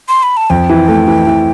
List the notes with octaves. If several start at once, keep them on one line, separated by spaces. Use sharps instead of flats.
C6
B5
A5
F2 G5
E3
A3
E3
E3